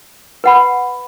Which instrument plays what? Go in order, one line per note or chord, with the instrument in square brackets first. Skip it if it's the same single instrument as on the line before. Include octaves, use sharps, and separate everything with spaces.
[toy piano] B4 F#5 B5